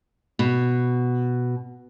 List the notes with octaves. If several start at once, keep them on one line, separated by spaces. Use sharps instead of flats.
B2